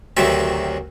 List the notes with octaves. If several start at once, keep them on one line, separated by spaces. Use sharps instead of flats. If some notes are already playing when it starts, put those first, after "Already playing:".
D2 C3 D#3 F#3 E5